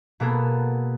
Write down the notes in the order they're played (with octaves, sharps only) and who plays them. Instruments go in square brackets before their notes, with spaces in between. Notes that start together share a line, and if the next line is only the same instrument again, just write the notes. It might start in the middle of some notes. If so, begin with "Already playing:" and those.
[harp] B2 A#3 B3 G#4 A4